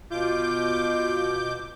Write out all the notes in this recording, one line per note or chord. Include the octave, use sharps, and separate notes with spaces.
B2 F4 D6 G6